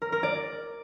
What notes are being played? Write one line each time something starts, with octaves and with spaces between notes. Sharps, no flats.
A#4
A#4
D5